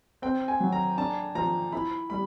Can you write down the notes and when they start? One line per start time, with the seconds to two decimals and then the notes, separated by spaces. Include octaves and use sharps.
0.22 C4 G5
0.48 G#5
0.60 F#3
0.72 A#5
0.98 D4 A5
1.35 F3 A#5
1.72 E4 B5
2.10 G3 B5